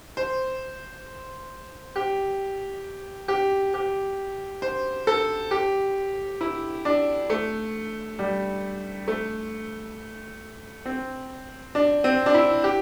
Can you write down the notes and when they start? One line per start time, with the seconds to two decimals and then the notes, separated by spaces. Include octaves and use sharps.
0.17 C5
1.96 G4
3.28 G4
3.74 G4
4.62 C5
5.07 A4
5.51 G4
6.41 E4
6.85 D4
7.30 A3
8.19 G3
9.08 A3
10.85 C4
11.75 D4
12.04 C4
12.26 D4
12.34 E4
12.64 G4